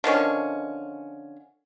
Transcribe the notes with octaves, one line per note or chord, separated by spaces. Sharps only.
D3 D#3 F3 C#4